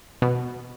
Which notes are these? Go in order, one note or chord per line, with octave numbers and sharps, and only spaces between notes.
B2